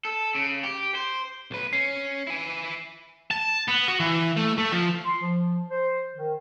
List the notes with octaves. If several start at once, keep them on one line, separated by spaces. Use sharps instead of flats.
A4
C#3
G4
C5
B1 B4
C#4 C7
E4 G#5
A5
B3
F#4
E3
A3
A3
F3
C6
F3
C5
D#3